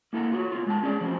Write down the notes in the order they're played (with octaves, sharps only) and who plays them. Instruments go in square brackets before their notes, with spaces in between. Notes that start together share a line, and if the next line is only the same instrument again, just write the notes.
[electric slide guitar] A#3 E4 A4 F#5 A#5
F4 F#4 A#4 C#5
B3 F4
G#3 F4 A5
C#4 G#4 C#5 D5
F3 C4 C#4 F#4